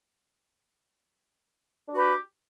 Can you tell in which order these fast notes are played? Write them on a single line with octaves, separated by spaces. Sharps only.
D4 F#4 B4 G4